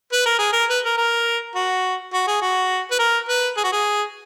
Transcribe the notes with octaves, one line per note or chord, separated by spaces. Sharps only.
B4
A#4
G#4
A#4
B4
A#4
A#4
F#4
F#4
G#4
F#4
B4
A#4
B4
G#4
F#4
G#4